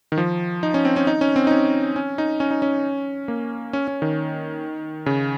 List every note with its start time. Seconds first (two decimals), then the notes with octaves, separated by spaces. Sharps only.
0.12 D#3
0.18 F3
0.63 D#4
0.74 C#4
0.85 C4
0.96 C#4
1.07 D#4
1.21 C#4
1.36 C4
1.47 D#4
1.51 C#4
1.96 C#4
2.18 D#4
2.40 C#4
2.51 D#4
2.62 C#4
3.28 A#3
3.73 C#4
3.88 C#4
4.02 D#3
5.06 C#3